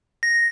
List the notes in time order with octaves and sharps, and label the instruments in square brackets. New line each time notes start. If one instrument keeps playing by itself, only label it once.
[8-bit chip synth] A#6